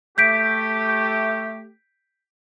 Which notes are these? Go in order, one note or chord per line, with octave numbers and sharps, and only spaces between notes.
A3 G4 G6 B6 D7